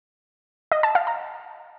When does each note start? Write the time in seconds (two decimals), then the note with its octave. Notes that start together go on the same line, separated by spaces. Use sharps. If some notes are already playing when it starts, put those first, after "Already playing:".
0.72 D#5
0.83 A5
0.95 F5
1.07 A#5